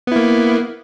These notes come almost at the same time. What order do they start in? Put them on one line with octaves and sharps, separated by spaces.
B3 E4 A#3